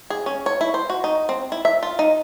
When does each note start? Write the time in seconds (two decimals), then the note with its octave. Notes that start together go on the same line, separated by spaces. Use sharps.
0.10 G#4
0.26 C#4
0.46 C#5
0.61 E4
0.74 C5
0.90 F#4
1.04 D#4
1.29 C4
1.52 E4
1.65 E5
1.83 F4
1.99 D#4